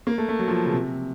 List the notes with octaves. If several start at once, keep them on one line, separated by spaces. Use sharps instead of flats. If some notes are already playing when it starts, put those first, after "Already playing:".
A#3
A3
A3
F#3
F3
C#3
C3